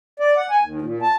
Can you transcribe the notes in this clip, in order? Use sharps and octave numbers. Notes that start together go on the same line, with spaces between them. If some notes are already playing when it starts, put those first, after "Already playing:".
D5
F#5
G#5
D#2
A#2
A5